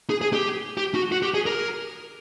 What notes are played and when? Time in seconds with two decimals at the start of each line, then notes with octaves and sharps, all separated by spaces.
0.10 G#4
0.21 G#4
0.33 G4
0.78 G4
0.95 F#4
1.12 F#4
1.23 G4
1.34 G#4
1.46 A#4